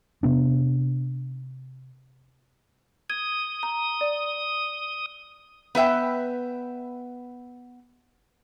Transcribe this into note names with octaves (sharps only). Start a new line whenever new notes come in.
C3 B3 D4
D#6 G#6
A#5
D5
B3 B4 E5 G5